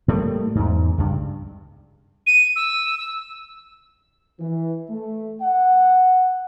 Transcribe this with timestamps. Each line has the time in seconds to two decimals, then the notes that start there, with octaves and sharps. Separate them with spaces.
0.08 A2 G3 A3 A#3
0.55 E2 G#2
0.98 C#2 G2
2.27 D#7
2.56 E6
2.98 E6
4.39 E3
4.90 A3
5.41 F#5